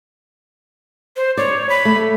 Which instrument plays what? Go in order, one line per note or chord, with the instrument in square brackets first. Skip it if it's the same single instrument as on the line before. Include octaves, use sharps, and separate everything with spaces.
[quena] C5
[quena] C#5 [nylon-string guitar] D5
[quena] B5
[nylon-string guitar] A3